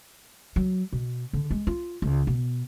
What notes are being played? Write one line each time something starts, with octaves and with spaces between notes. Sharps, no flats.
F#3
B2
D3
G#3
F4
C#2
B2